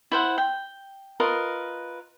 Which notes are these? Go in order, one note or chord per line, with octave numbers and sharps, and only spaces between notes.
E4 C5 F#5
G5
F4 A#4 B4 D#5